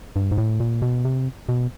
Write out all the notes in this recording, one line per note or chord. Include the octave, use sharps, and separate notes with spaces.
G2
G#2
A2
A#2
B2
C3
B2